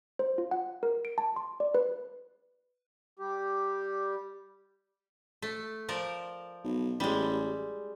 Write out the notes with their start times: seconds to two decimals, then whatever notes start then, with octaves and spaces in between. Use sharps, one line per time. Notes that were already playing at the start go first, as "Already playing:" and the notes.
0.19 C5
0.38 F4
0.51 F#5
0.83 A#4
1.05 D7
1.18 A5
1.36 C6
1.60 D5
1.75 B4
3.19 G3 G4
5.42 A3
5.89 F3 A#4 D5
6.64 B1
7.00 A1 G3 G#3